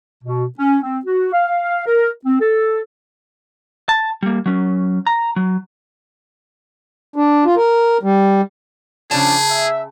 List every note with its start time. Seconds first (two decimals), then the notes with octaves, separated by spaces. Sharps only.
0.24 B2
0.58 C#4
0.83 C4
1.06 F#4
1.33 F5
1.86 A#4
2.25 C4
2.40 A4
3.89 A5
4.23 G3 A#3
4.46 F#3 C#4
5.07 A#5
5.36 F#3
7.16 D4
7.45 F4
7.57 A#4
8.03 G3
9.11 C#3 F3 C#4 D4 G#4 A5
9.50 E5